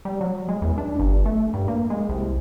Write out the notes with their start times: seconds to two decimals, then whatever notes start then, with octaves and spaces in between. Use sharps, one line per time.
0.05 G3
0.21 F#3
0.49 G#3
0.62 E2
0.78 D4
0.99 G1
1.26 A3
1.54 G2
1.68 A#3
1.90 G#3
2.09 C2